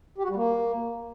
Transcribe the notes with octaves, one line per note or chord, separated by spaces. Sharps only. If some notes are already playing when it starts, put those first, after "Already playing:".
G4
F#4
G3
A#3